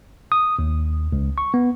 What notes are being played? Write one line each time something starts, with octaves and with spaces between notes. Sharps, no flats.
D#6
D#2
C#2
C#6
B3